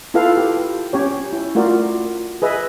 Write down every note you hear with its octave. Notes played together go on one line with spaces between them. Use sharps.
E4 F4 A4 B4 F5
G4
C#4 G4 C#5
E4
A3 F4 F#4 A#4 D5
G#4 B4 D#5 E5